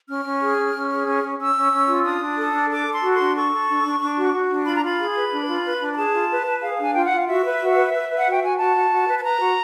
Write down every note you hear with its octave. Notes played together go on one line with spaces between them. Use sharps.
C#4 F6
C#4
G#4
C#4
C#4
G#4
C#4
C#4
C#4 E6
C#4
C#4
F4
D4 D#6
D4
A4
D4
A4 D6
A4
C6
F#4
C6
D4
A4 C#6
A4
D4
D4
D4
F#4
F#4
D4
F4 B5
A#5
F4 B5
G#4
B4
D4
F4
B4
D4
A#5
G#4 A5
F4
B4
B4
G#4 F5
D4 G#5
F4 G5
F#5
F4
F5
F#4 E5
B4
F#4
B4
B4
B4
F#5
F#4 G5
F#4 G#5
F#4 A5
F#4
F#4
B4
A5
B4 A#5
F#4